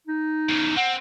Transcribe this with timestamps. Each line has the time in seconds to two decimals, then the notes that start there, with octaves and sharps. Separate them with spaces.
0.07 D#4
0.49 E2 C#3
0.77 C4 F#5